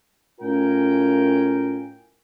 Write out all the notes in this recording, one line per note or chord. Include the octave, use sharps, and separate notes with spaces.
A2 C#4 F4 A#4 G5 G#5